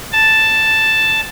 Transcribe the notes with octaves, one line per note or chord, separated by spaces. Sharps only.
A5